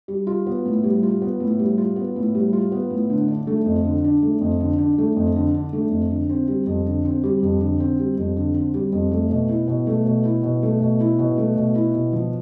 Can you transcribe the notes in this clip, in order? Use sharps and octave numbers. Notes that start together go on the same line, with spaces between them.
G3
F4
B3
A2
G3
F4
B3
A2
G3
F4
B3
A2
G3
F4
B3
A2
D3
D4
A3
F2
D3
D4
A3
F2
D3
D4
A3
F2
D3
D4
A3
F2
D3
C4
G3
F2
D3
C4
G3
F2
D3
C4
G3
F2
D3
C4
G3
F2
A3
B2
E4
B2
A3
B2
E4
B2
A3
B2
E4
B2
A3
B2
E4
B2
F3